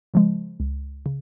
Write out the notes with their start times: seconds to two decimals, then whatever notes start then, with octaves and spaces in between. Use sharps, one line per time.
0.14 C#3 F3 G#3
0.60 C#2
1.06 C#3